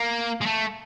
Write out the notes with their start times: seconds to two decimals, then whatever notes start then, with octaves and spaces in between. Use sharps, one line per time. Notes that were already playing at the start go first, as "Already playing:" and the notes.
Already playing: A#3
0.41 G#3
0.46 A3